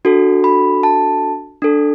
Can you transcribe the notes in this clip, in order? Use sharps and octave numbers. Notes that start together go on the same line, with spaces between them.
D4 F#4 A4
B5
A5
D4 A4